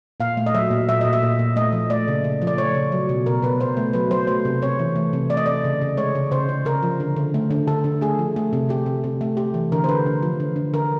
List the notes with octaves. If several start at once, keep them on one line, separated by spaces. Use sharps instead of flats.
A#2 F5
A3
D#5
F#3 E5
A#2
F#3 E5
A#2 D#5
E5
A#2
A#2
A3 D#5
F3
A3 D5
C#3
C#3
F3
D5
A3 C#5
C#3
F#3
B2
B2 A#4
B2 B4
B2 C5
A3
F#3 B4
F#3 C5
A3 C5
C3
C3 C#5
E3
A3
C3
A3 D5
D#5
C3 D5
C#3
C#3
G#3 C#5
C#3
C#3 C5
C#3
C#3 A#4
F3
D3
D3
A3
D3
D3 A4
D3
A3 G#4
F3
A3
C3
C3 G4
C3
C3
A3
A3 G4
E3
D3 A#4
C5
D3 B4
D3
F3
D3
D3
D3 A#4